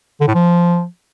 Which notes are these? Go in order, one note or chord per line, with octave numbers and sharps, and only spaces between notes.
D3
A2
F3